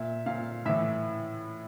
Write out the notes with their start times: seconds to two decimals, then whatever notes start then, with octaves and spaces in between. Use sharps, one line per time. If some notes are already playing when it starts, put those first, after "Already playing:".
Already playing: A#2 E5
0.26 A#2 F5
0.65 A2 E5
0.69 E3